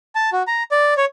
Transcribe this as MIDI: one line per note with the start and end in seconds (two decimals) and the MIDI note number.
0.15 0.30 81
0.32 0.43 66
0.47 0.63 82
0.71 0.94 74
0.97 1.05 73